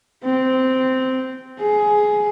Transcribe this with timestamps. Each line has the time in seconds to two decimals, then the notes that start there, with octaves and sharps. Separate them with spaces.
0.23 C4
1.59 G#4